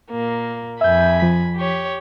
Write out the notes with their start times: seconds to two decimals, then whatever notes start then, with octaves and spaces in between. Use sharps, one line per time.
0.11 A#2 A#3
0.81 F2 E5 G#5 B5 G6
1.19 F3 B6
1.56 G4 C#5